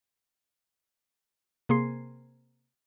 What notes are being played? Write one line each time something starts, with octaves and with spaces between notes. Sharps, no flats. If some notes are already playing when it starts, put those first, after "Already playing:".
C3 A#3 G#4 C6 C7